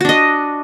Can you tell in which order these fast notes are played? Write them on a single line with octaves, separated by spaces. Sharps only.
F#4 D4 D#5